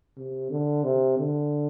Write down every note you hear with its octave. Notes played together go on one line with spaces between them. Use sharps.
C3
D3
C3
D3